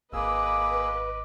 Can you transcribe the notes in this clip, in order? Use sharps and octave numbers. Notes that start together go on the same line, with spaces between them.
G#1 A#3 G#4 B4 D#5 D6 E6